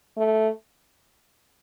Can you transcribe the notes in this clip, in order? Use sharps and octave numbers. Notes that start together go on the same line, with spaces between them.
A3